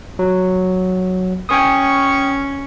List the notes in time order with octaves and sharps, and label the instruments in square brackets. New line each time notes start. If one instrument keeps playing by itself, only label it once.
[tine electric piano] F#3
[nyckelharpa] C#4 C#6 [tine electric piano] G5 G#5 D#6